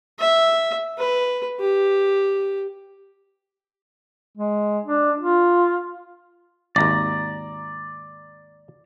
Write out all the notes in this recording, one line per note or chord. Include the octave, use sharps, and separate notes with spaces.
E5
B4
G4
G#3
D4
F4
G#1 D#2 D5 A#5